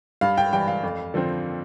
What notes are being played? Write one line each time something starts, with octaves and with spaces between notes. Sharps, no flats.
G2 F5
G5
E3 G3 G5
F5
F2
D3 F3 C4